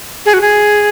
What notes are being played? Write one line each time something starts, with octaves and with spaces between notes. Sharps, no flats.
G#4
F#4
G#4